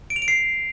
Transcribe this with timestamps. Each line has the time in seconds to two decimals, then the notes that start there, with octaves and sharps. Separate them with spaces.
0.10 D7
0.16 F7
0.22 D7
0.28 C7